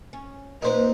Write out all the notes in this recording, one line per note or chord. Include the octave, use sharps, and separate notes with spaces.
C#4
A#2 A#3 C4 D#4 B4 C5